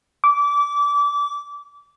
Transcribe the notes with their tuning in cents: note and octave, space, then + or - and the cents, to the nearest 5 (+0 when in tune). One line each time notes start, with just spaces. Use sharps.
D6 -25